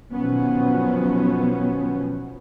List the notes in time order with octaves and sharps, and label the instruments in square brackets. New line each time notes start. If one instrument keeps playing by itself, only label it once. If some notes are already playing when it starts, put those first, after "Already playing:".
[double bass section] B2 D#3 F3 F#3 B3 C#4